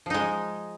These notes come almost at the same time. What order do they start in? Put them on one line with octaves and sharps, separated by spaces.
F3 D#4 G#3